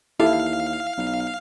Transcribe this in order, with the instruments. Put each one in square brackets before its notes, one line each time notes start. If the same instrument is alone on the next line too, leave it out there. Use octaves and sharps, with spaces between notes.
[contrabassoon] D#2 [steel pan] E4 [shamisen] G4 A4 E5 [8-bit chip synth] F5
[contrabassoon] B1